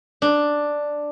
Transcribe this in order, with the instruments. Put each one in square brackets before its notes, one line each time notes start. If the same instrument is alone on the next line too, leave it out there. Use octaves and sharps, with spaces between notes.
[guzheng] D4